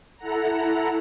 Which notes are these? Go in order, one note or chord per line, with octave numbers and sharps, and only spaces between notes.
E4 A4 F#5 A#5